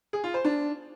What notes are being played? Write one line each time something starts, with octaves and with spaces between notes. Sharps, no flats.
G#4
F4
C5
D4